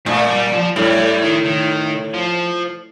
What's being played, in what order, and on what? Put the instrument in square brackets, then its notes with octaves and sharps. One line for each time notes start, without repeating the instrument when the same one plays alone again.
[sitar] A#2 [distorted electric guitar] A3
[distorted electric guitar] G3
F3
[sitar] A2 [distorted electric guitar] G3
[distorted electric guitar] G3
D#3
D#3
F3